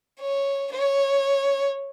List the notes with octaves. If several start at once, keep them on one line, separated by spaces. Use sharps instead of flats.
C#5
C#5